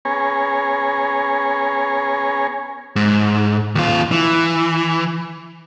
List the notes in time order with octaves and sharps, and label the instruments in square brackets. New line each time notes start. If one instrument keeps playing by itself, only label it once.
[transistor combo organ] B3 C#4 G#4 C#5 G#5 A#5
[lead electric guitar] G#2
D#2 F4
E3